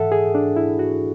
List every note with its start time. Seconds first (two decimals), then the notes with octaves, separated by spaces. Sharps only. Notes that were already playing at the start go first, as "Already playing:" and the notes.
Already playing: G#2 E3 A4 E5 F#5
0.12 G#4
0.35 D4
0.56 E4
0.79 F#4